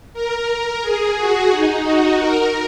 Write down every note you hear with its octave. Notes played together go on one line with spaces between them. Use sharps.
A#4
A#4
G#4
F#4
D#4
F#4
A#4